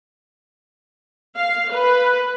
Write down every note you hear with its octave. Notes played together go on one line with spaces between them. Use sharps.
F5
B4